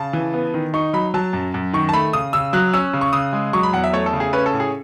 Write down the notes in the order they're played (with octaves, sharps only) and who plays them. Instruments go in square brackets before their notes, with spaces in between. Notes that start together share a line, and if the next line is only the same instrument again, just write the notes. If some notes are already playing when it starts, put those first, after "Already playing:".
Already playing: [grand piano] C#3 A5
E3
B3
D#3
D#4 C#6
F#3 B5
F#3 A5
F#2
F#2
D#3 C#6
A5
A3 B5
C#3 D#6
C#3 E6
F#3 F#6
C#4 E6
C#3
C#6
C#3 D#6
G#3
F#3 C#6
B5
E2 F#5
E5
A3 C#5
A4
C#3
G#4
C#4 B4
A4
A2
G#4